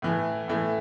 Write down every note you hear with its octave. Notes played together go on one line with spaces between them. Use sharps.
A2 E3 A3
A2 E3 A3